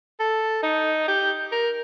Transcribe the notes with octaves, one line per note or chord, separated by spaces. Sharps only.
A4
D#4
G4
A#4